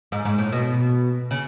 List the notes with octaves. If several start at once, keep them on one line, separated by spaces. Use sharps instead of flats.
G#2
G#2
A2
B2
C#3